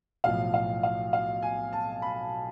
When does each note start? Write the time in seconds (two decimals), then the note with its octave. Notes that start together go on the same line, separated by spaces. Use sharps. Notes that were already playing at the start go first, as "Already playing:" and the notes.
0.24 B1 A2 F3 F5
0.54 F5
0.83 F5
1.13 F5
1.42 G#5
1.73 A5
2.02 B5